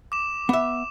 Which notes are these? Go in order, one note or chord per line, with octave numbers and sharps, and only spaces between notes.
D6 E7
B3 E5